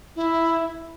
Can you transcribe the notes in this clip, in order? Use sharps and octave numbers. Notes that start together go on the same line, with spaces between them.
E4